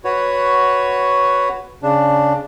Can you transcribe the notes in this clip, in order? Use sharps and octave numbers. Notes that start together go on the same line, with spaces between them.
F#4 B4 C#5
C#3 D4